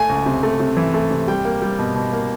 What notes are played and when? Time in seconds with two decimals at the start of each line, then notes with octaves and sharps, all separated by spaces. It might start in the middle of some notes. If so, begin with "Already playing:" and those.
Already playing: A3 G#5
0.09 C#2
0.26 C3
0.43 A3
0.60 C3
0.77 E3
0.94 A3
1.11 C3
1.28 G3 G5
1.45 A#3
1.62 G3
1.79 B2
1.95 B2
2.13 A#3